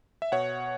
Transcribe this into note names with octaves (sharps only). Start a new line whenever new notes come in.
E5
B2 C#5 F#5